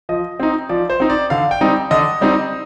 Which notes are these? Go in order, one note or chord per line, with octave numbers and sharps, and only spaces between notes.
F3 D#5
C4 D#4
F3 D5
C5
C4 D#4
D5
D3 F5
G5
G3 C4 D#4
D3 D#5
G3 C4 D#4